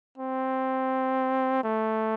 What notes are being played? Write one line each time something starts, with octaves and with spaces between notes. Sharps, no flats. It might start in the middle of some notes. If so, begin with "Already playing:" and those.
C4
A3